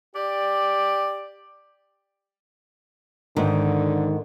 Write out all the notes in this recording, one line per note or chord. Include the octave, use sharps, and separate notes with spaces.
G4 D5
G#2 D3 D#3